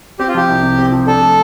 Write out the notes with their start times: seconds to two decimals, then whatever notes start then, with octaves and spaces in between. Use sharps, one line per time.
0.19 C4 G4
0.28 F4
0.35 F3 G4
0.48 C2
0.63 C3
0.78 C4
0.92 F3
1.07 D4 A4
1.22 A3